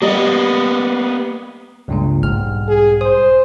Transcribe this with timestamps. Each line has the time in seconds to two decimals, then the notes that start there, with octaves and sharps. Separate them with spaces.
0.02 G3 A#3 B3 D#5
1.88 C#2 G2 A#2
2.23 B1 G#2 G3 F6
2.68 G#4
3.01 C5 D#6